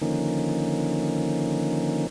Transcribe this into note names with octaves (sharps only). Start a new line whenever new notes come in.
D3 D#3 F3 A#3 C#4 D#4